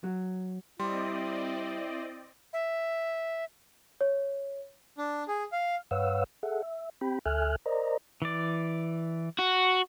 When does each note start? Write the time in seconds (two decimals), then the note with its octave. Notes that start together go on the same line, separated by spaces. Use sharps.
0.04 F#3
0.80 G3 C4 E4 D5 D#5 C6
2.53 E5
4.01 C#5
4.98 D4
5.28 G#4
5.52 F5
5.91 G2 B4 C#5 F5 F#5 E6
6.43 G#4 A4 E5 F#5
6.62 E5
7.01 C4 G4 G5 B5
7.26 D2 A4 E5 G#5 F6 F#6
7.66 A#4 C5 D5 D#5 A#5
8.22 E3 D5
9.39 F#4